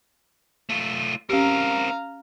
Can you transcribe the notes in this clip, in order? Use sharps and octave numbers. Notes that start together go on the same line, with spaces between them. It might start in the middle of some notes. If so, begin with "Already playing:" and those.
A3 F4
C4 C#4 G4 A#4 F5 A#5